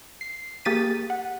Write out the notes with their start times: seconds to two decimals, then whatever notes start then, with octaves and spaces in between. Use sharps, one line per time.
0.21 C7
0.65 A#3 G4 G#4 A6 B6 D#7
1.10 F#5